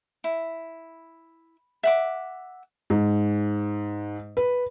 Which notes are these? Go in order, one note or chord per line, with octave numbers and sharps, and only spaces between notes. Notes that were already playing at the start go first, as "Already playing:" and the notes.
E4
E5 F#5 D6
G#2
B4